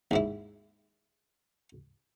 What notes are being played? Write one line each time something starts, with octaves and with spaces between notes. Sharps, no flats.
D#2 G#2 E4